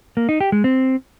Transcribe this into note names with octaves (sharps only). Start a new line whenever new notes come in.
A#3
D#4
G4
G#3
C4